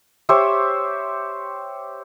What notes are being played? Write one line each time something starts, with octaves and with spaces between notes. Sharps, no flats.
G4 C5 C#5 E5